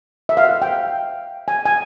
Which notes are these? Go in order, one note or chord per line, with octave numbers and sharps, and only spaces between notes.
E5
F5
F#5
G5
G#5
G#5